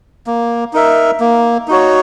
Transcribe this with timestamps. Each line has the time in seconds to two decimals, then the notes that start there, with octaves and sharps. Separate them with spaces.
0.27 A#3
0.73 D#4 A#4 E5
1.20 A#3
1.68 D#4 F#4 C#5